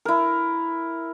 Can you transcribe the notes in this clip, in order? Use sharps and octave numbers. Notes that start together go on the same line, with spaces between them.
E4 A#4